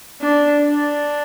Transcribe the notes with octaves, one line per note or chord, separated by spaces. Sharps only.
D4
D4